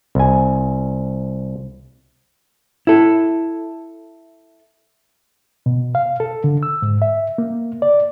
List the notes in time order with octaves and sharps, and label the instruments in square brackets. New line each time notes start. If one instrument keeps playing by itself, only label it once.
[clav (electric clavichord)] C2 G#5
[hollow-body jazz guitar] E4 A4
[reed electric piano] B2
F5
A4
D3
E6
G#2
E5
A#3
D5